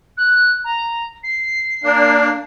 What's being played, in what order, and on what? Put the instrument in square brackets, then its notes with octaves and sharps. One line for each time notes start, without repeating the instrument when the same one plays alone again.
[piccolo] F#6
A#5
C7
[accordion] A#3 D4